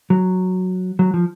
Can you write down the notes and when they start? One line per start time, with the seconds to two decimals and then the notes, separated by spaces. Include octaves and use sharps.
0.10 F#3
0.99 F#3
1.14 F3